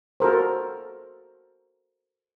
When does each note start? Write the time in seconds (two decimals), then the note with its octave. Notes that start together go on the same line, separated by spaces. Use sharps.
0.20 F#4 A4 A#4 C5